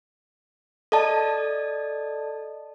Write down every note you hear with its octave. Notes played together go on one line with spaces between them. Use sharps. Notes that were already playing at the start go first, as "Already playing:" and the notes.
A4 D5 D#5 A5